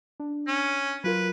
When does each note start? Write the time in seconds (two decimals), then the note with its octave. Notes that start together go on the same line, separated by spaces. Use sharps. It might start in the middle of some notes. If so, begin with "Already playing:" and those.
0.20 D4
0.48 C#4
1.04 F#3 F4 A#4 B4